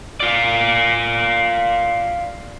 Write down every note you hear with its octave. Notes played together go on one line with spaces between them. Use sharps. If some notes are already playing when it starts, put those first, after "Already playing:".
F4 D5